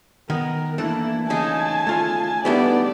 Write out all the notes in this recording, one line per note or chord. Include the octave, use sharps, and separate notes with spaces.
D#3 B3 A#4
E3 A3 A#3 D4 E4 A4
C#3 D#4 G#5 A5
A3 F4 F5
G3 A3 B3 D4 D#4 G4 G#4 D5